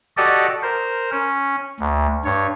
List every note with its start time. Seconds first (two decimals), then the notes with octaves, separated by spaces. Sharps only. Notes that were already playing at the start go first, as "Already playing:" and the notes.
0.17 F#4 G4 A4 D5 D#5
0.63 A#4 C5
1.12 C#4
1.80 D2
2.25 G2 C#5